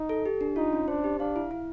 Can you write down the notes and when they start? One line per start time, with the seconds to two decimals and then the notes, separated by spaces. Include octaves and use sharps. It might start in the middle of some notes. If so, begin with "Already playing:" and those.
Already playing: D#4
0.09 A4
0.26 G4
0.41 D4
0.56 D#4 F4
0.73 C#4
0.88 D4 C5
1.04 G4
1.20 D4 F5
1.36 E4
1.51 E4